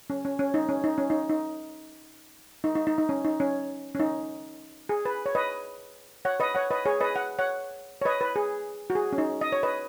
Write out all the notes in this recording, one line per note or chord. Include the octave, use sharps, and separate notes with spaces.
C#4
C#4
C#4
D#4
C#4
D#4
C#4
D#4
D#4
D#4
D#4
D#4
D#4
C#4
D#4
C#4
C#4
D#4
G#4
B4
C#5
B4 D#5
C#5 F#5
B4 D#5
C#5 F#5
B4 D#5
G#4 C#5
B4 D#5
F#5
C#5 F#5
C#5
B4 D#5
B4
G#4
F#4
G#4
C#4
D#4
D#5
C#5
B4 D#5